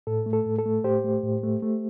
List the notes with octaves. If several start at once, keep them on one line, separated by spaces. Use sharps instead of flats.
A2 A4
A3
A4
A2
A4
A3
A2 G4 C5
A3
A2
A3
A3